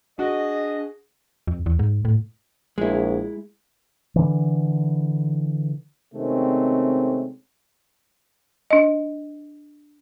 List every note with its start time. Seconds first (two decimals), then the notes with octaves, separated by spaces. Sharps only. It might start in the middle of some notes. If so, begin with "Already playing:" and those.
0.19 D4 F#4 G#4 D#5
1.47 F2
1.66 E2
1.79 G#2
2.05 A2
2.78 A#1 G#3 E4
4.16 D3 E3
6.14 C3 D#3 G#3 A3 C4 C#4
8.71 D4 D#5